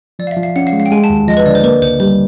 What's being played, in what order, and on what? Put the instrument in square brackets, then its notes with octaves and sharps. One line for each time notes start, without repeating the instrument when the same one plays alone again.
[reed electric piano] F3 [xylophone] D5
[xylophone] F5
E5
[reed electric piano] F3
[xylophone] F5
[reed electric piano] C#4 [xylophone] F#5
[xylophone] F5
[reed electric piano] G#3
[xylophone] F5
G5
[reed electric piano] G#3 [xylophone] G#5
[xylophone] A5
[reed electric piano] D#2
[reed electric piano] F3 [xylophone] D#5
[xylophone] B4
[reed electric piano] D3 [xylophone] D5
[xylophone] C5
[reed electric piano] A#3 [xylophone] B4
[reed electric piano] C#2 [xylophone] C5
[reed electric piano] G3 [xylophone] C5